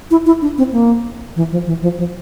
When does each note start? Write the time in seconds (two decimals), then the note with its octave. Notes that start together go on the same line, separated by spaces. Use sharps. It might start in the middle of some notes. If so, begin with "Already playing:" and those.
0.11 E4
0.26 E4
0.42 D4
0.58 C4
0.72 A#3
1.36 E3
1.51 F3
1.67 E3
1.82 F3
1.98 F3